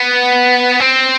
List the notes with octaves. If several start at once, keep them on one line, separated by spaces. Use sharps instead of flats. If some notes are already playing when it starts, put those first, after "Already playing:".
Already playing: B3
C4